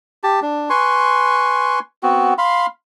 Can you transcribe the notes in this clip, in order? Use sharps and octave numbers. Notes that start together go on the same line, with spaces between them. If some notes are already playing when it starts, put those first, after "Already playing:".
G4 A5
D4
B4 G#5 C6 C#6
B3 C4 F#4
F5 B5 C6